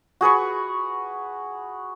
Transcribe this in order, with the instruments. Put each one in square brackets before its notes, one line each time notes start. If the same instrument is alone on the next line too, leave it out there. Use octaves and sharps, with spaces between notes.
[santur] F#4 G#4 B4 C#6